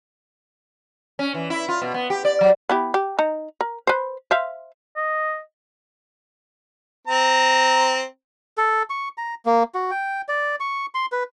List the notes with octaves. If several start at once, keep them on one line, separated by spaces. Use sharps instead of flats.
C#4
E3
E4
F4
B2
B3
G4
D5
F#3
B3 E4 G4
G4
D#4 A#5
A#4
B4 C5
C5 E5 F5
D#5
C4 A#5
A4
C#6
A#5
A#3
F#4
G5
D5
C#6
C6
B4